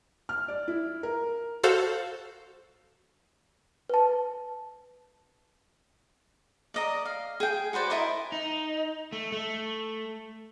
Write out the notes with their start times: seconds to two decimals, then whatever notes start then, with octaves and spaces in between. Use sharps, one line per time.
0.29 F6
0.48 D5
0.68 E4
1.03 A#4
1.63 F#4 A4 C5 F5
3.90 B4 A5
6.74 D5 D#5 A#5
7.05 F5
7.40 G#4 G5
7.73 F#4 B4 C5 D5
7.90 E4 A#4 D#5 C6
8.32 D#4
9.12 A3
9.32 A3